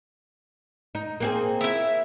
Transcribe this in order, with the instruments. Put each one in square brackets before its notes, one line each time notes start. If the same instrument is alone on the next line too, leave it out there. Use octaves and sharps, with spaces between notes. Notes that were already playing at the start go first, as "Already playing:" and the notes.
[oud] D#4
A#3 C4 G#4
[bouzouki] E4 E5